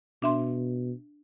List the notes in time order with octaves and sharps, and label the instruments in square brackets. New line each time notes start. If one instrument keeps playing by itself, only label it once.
[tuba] B2 [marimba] D4 E5 C6